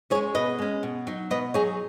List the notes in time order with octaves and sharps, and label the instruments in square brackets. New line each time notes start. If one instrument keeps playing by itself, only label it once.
[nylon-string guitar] C#4 G#4 C#5
G#3
B2 B4 D#5
G#3 C#4
B2
F#3 D#4
B2 B4 D#5
F#3 D#4 G#4 C#5